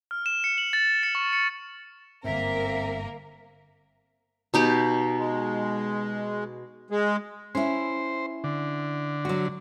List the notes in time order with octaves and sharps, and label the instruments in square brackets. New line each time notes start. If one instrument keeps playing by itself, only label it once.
[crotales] F6
E7
C#7
F#7
A6
C#7
C#6
C#7
[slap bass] G1 G#2 [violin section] A#3 A#4 [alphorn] C4 [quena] E5
[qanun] B2 D#4 G4
[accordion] G#3
G#3
[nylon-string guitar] C#4 E4 [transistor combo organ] C5
[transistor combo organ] D3
[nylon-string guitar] F#3 F#4